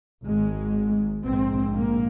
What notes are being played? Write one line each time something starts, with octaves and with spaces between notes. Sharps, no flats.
G#1 G#2 G#3
A#1 G#2 C4
A#3